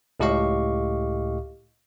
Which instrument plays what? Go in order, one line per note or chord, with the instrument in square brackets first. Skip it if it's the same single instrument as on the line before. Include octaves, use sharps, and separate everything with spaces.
[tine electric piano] C#2 A2 G4 D#5 F5 C#6